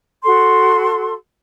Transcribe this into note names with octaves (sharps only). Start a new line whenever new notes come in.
F#4 A4 C6